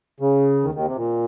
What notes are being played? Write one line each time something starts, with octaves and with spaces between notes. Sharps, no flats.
C#3
D#2 D#3
D#2 D#3
C3
A#2